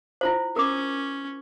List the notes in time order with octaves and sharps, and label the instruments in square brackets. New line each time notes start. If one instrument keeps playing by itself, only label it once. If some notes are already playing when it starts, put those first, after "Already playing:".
[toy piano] E4 F4 C5
[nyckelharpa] C#4 [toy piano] A#4 D6